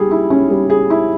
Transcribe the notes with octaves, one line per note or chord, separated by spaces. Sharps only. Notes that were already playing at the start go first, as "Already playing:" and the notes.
Already playing: G3 G#4
E4
C#4
G3
G#4
E4